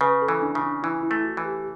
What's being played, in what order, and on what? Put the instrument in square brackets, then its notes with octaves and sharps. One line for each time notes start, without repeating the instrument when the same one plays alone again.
[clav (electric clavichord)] C#3 [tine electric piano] B4
[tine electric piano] A4
[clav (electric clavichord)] E3
[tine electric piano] D4
[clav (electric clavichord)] C#3
[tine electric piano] D4
[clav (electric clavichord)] E3 [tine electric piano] E4
[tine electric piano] E4
[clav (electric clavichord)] A3
[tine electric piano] F#4
[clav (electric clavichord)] E3
[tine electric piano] G4